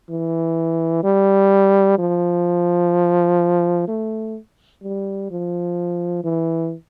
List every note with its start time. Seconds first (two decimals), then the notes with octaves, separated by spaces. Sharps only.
0.10 E3
1.03 G3
1.99 F3
3.88 A3
4.83 G3
5.31 F3
6.24 E3